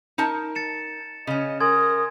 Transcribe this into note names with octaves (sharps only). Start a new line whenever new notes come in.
D#4 A#4 A5
A6 C#7 E7
C#3 C#4 D#5
A#4 G#5 C6 D#6 G#6